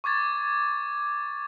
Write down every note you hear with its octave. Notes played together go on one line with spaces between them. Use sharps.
C#6 D6 G#6 A6